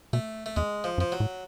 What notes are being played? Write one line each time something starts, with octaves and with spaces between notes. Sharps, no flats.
B2 A3
A3
E2 G#3
F3
F#2
F3
F#3
A2